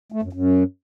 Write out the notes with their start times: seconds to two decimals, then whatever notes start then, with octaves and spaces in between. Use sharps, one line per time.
0.12 A3
0.23 F#2
0.33 F#2